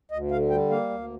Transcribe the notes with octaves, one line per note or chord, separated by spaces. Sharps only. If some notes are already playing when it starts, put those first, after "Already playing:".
D2 D#5
D3 F5
G3 G5
A#3 F5
D2